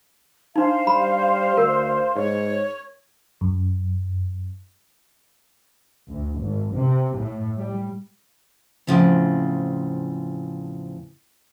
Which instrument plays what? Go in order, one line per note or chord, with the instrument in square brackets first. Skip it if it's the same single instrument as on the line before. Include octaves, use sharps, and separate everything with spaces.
[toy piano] D4 D#4 [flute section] C5 F5
[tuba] G3 [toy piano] B5
[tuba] D2 [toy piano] A#4
[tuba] G#2 [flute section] C#5
[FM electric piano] F#2
[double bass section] D2
G#1
C3
A2
G3
[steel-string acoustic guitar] E2 A2 C#3 F3 C4